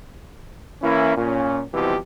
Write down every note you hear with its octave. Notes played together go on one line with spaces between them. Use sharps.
E3 A#3 C#4 E4
A#2 C#4
C2 B2 E3 F3 C4 G4